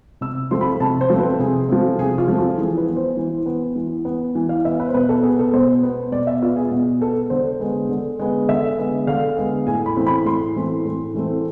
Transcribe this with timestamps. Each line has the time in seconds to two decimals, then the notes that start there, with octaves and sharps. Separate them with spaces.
0.21 C3 E6
0.51 F3 A3 C4 C6
0.61 B5
0.80 C3 A5
1.01 C5
1.10 F3 A3 C4
1.19 B4
1.39 C3 G#4
1.69 F3 A3 C4
1.99 C3 G#4
2.18 F4
2.28 F3 A3 C4
2.39 F4
2.58 E3 G#4
2.77 B4
2.87 B3
2.97 C5
3.17 E3
3.46 B3
3.76 E3
4.05 B3
4.35 E3
4.49 F5
4.64 B3 E5
4.80 B4
4.89 C5
4.94 B2 B4
5.09 A4
5.23 B3 G#4
5.39 A4
5.53 B2 C5
5.83 B3
6.12 B2 D5
6.27 E5
6.42 B3 F4
6.56 G#4
6.71 B2
7.01 B3 A4
7.30 D3 C5
7.60 G#3 B3
7.89 D3
8.19 G#3 B3
8.49 D3 E5
8.78 G#3 B3
9.07 D3 F5
9.37 G#3 B3
9.67 A2 G#5
9.86 B5
9.97 E3 A3 C4
10.07 B5
10.25 A2 C6
10.56 E3 A3 C4
10.85 A2
11.15 E3 A3 C4